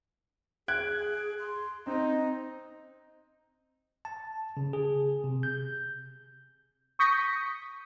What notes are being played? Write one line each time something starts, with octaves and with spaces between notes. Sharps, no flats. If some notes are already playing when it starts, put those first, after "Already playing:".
G#4 F#6 G#6 D7
C6
C4 D#4 D#5
A5
C#3
G#4
C3
G6
C#6 D#6 G6 A#6 B6 C#7